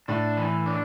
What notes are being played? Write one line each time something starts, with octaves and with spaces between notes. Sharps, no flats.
A2 D4
E3
D4